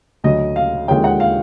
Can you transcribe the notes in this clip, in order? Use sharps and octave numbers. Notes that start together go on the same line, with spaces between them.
D2 D3 F#3 D#5
F5
D#2 D3 F3 G#3 C#4 G5
F#5
F5